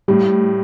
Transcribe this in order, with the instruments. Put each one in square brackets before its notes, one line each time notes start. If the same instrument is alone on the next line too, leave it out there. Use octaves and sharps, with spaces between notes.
[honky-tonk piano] A2 [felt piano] G3